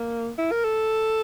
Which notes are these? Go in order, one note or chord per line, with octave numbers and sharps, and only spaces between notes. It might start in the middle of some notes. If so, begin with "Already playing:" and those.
Already playing: A#3
E4
A#4
A4